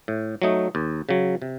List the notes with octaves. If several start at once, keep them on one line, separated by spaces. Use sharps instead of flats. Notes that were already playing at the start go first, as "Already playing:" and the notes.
A2
F#3 A3 D#4
D#2
C#3 F#3
C3